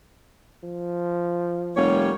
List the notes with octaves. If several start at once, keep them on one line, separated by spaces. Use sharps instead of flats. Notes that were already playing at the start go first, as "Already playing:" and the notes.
F3
F1 G3 A#3 C#5